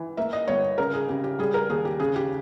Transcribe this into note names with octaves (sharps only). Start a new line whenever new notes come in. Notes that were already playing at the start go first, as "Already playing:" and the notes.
Already playing: E3
A#3 E5
D#5
G1 C#5
C#3 A#4
G#4
C#3 G4
G4
G3 G#4
A#4
D#2 G#4
G4
C#3 G#4
G4